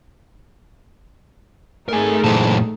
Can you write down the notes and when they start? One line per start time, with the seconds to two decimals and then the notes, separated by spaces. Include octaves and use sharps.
1.89 A3 D#4 G#4 A#4 G#5
2.24 F#2 A#2 E3 C5 A5